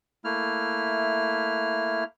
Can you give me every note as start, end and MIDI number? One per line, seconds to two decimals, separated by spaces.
0.24 2.04 57
0.24 2.04 58
0.24 2.04 64
0.24 2.04 89